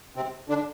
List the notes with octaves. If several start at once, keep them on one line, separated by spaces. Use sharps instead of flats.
C3 C4
D3 D4